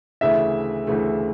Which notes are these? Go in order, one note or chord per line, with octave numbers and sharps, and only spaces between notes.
D2 C#3 E3 A3 E5
D2 C#3 E3 A3